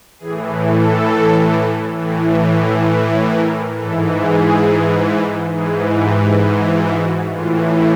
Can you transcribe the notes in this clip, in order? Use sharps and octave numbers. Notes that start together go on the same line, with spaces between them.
A2 E3 G#4
A4
A2 E3
B4
A#4
G#2 E3 A4
G#4
G#2 E3 G#4
G4
F#4
F4
F#4
A2 E3 F4